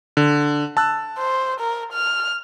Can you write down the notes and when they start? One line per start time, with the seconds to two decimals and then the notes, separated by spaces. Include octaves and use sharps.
0.17 D3
0.77 A5 E6 F#6
1.18 C5
1.60 A#4
1.93 F6